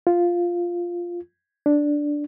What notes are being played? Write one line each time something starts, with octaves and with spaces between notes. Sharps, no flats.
F4
D4